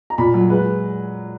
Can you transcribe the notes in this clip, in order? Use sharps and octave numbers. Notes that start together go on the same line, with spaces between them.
A#5
A#2 B5
F#3
G#3 B4